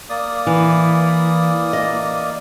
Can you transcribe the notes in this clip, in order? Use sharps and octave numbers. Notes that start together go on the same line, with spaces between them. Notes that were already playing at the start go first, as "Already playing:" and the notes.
A#3 D5 D#6
E3
D#5